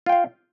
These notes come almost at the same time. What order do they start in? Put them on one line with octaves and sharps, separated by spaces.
F4 G5 F5